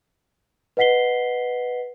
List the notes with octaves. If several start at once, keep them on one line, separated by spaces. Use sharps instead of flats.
B4 D#5 F#5 B6 C7 G7